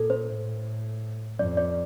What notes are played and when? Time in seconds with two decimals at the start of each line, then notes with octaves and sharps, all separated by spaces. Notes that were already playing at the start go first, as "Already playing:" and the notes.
Already playing: A#2 A4
0.10 C5
0.27 A2
1.39 F2 D5
1.57 D5